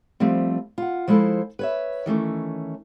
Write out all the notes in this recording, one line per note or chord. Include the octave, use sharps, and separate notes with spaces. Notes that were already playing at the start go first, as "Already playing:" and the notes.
F3 G3 A3 C4
F4 F#5
F3 G#3 E4 A4 C5
B4 C#5 E5
D#3 E3 A3 C#4